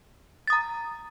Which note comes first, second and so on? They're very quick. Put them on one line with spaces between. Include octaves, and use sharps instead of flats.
A6 D#6 A#5